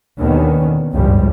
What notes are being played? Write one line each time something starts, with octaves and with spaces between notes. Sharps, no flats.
D#2 B2 D3 D#3 B3 C#4
G1 C#2 F#2 A2 F3 G3